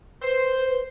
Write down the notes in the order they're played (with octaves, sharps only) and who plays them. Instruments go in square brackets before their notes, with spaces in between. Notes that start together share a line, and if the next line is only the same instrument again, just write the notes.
[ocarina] B4 [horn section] C5